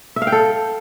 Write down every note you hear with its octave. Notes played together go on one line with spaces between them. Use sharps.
E5
F5
G5
A4